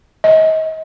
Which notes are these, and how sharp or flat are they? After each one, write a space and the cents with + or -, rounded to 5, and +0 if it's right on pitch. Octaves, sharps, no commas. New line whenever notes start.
D#5 +35